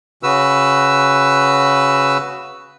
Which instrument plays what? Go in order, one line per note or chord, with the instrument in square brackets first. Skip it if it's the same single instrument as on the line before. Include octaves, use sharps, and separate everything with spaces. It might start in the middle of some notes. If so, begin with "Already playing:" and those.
[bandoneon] C#3 F#4 B4 E6